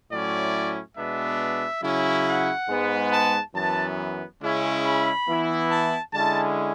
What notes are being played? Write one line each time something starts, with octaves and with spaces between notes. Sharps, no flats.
A2 F#3 C#4 E4 D5
B2 G#3 B3 D4 E5
C#3 F#3 C#4 E4
F#5
G#2 G#3 B3
A5
F#2 E3 B3 A5
C#3 G#3 C#4 E4
B5
E3 B3 E4
A5
D3 G#3 C#4 E4 A5